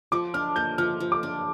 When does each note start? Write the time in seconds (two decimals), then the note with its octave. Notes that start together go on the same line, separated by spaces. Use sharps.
0.12 F3 D6
0.34 D4 F6
0.56 A#3 G6
0.78 F3 F6
1.00 F3
1.12 D6
1.23 D4